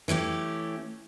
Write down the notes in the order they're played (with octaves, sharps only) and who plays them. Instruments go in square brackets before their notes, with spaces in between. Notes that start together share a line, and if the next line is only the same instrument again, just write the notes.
[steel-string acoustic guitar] E3 A3 C#4 G4